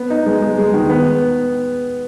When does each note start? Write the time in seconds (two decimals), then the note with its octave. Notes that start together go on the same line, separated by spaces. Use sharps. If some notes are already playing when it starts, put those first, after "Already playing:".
Already playing: B3
0.10 D#4
0.26 G#3
0.42 G#3
0.58 G#3
0.74 D#3
0.89 B3